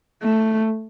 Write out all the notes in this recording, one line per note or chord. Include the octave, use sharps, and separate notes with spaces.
A3